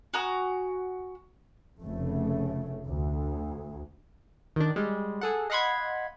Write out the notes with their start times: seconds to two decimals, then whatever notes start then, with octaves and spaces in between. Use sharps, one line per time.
0.14 F#4 G#5 A#5 D#6
1.81 F1 C#3 A3
2.86 D2
4.56 D#3 D4
4.76 G3 G#3
5.21 G#4 A4 F#5
5.50 D#5 F5 F#5 B5 C6 G#6